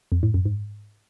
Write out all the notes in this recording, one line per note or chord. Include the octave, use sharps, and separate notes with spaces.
F2
A2
F#2
G#2